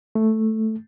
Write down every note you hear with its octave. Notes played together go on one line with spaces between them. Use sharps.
A3